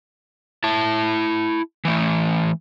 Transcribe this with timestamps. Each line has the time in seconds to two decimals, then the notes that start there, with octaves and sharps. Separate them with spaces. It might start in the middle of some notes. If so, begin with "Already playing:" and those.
0.64 E4 A5
1.85 E3 A3